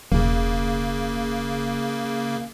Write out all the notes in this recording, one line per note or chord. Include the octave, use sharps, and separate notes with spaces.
E1 C#3 A#3